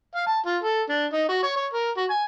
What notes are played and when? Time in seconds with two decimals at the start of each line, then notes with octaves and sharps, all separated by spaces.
0.15 F5
0.27 A5
0.46 F4
0.63 A4
0.89 D4
1.13 D#4
1.29 F#4
1.43 C#5
1.56 C#5
1.73 A#4
1.97 F#4
2.10 G#5